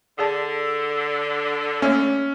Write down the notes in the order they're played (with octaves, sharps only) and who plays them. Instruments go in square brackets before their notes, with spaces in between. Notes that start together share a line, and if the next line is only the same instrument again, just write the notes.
[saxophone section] D3 [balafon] G#4 D5 A5
[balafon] A3 A#3 C#5 [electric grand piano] C#4